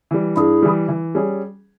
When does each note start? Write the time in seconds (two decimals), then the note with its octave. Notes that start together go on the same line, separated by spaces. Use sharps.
0.11 E3 G3
0.37 G2 E4 G#4
0.62 E3 G3
0.88 E3
1.15 G3 C#4 G#4